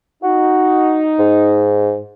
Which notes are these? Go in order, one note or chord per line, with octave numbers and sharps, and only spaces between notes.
D#4 F#4
G#2